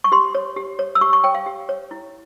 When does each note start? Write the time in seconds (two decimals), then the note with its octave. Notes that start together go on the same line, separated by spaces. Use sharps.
0.04 C#6
0.12 G4 C6
0.35 C#5
0.56 G4
0.79 C#5
0.95 E6
1.01 G4 C#6
1.13 C#6
1.24 C#5 G5
1.35 F5
1.46 G4
1.69 C#5
1.91 E4